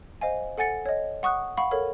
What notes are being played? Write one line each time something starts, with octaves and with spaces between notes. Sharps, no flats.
C5 D#5 F5 G#5
A4 F#5 G#5 A6 C#7
C#5 D#5
F#5 C#6 D#6 F#6
F5 F#5 B5 C#6
A4 A#4 C#5